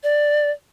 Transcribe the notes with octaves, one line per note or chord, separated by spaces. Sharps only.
D5